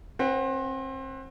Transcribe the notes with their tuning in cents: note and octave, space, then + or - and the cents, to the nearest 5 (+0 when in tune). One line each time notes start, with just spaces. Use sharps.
C4 +30 B4 +0 F#5 +5